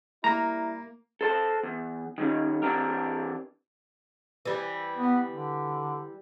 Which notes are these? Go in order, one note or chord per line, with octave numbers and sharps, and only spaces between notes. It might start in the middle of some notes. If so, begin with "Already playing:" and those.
G3 A#3 E4 A#5
A4 C5 A5
E2
D#3 G3 C#4
E3 C4 D4 G4 A#4
E3 G3
B3
D3